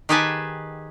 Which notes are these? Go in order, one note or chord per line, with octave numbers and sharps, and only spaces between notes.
D#3 G4 G#4 B4 G#5 A5